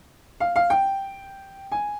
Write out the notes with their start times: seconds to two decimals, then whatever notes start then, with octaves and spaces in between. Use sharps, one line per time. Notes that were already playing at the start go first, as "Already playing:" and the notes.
0.40 F5
0.56 F5
0.70 G5
1.72 G#5